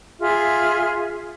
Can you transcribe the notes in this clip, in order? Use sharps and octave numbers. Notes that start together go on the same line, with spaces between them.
F4 G#4 E5 F6